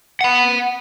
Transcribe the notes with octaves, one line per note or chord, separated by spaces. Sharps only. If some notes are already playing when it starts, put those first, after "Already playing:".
F#5 B5